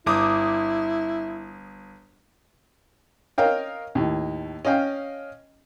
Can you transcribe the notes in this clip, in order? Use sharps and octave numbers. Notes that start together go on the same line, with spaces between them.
G1 E4 D6 D#6
A#4 C#5 D#5 F5 G5
D#2 A2
C#4 D#5 F5 G5